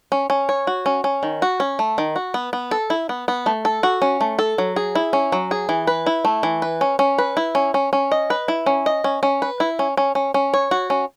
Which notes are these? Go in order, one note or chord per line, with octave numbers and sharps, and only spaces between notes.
C#4
C#4
C#5
F#4
C#4
C#4
D#3
F#4
C#4
A3
D#3
F#4
B3
B3
A4
E4
B3
B3
A3
A4
F#4
C#4
A3
A4
F#3
G#4
E4
C#4
F#3
G#4
E3
B4
E4
A3
E3
B4
C#4
C#4
B4
E4
C#4
C#4
C#4
D#5
B4
E4
C#4
D#5
C#4
C#4
B4
E4
C#4
C#4
C#4
C#4
C#5
F#4
C#4